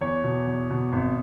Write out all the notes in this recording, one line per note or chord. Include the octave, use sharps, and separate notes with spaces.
E2 C#5
B2
E2
B2
G#1